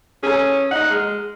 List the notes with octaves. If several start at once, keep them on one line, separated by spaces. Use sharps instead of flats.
C#4 G#4 A4 G#5
D#4 D#5 F#5
G#3 F6